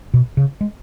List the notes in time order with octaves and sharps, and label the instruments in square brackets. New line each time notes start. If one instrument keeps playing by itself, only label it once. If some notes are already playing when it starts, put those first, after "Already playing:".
[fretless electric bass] B2
C#3
G#3